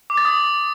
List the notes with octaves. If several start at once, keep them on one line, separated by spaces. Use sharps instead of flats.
D6
A6
D#6